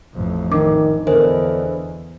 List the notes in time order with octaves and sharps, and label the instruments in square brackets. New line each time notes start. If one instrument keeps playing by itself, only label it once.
[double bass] A1 F2
[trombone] D#3 [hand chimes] D4 [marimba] D6
[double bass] E2 [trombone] D3 [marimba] A#4 [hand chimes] C5 D#5 G#5